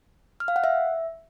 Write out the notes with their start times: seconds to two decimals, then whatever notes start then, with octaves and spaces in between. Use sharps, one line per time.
0.40 F6
0.48 F5
0.56 F#5
0.64 E5